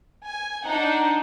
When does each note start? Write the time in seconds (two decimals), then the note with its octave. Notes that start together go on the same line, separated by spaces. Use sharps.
0.25 G#5
0.63 D4 D#4 F#5 G6